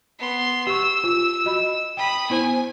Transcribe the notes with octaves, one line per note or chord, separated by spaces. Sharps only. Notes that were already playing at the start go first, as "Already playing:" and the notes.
B3 C6
G4 C#6 E6
F4
F#4 D#5 B5
G5 B5 D#6
B3 E4 C5 G#5